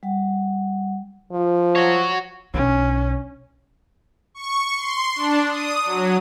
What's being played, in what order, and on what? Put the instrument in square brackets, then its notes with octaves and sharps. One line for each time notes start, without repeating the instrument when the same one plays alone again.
[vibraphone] G3 F#5
[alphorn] F3
[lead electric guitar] F#4 C#5
[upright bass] B1 D4 [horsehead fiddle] C#4
[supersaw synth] C#6
C6
D4
D#6
F#3